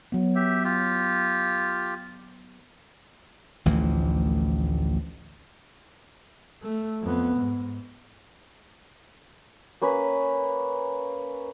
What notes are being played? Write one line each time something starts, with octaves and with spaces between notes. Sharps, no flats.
F#3 B3
G4 E5
F4 G4
A1 D2 E3 F3
A3
F2 B3
G#2
A#3 C#4 B4